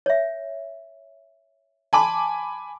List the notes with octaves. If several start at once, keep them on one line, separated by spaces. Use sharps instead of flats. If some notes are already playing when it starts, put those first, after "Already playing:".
C#5 E5
G#5 A5 B5 C6 D6